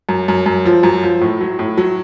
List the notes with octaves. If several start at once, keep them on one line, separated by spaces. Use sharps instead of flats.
F#2
F#2
F#2
F3
F#2
F3
A2
F#3
A2
F#3